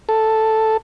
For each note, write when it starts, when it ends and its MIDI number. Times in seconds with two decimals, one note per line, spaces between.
0.09 0.77 69